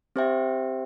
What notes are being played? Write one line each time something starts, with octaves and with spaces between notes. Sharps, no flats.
C4 G4 C5 E5 G5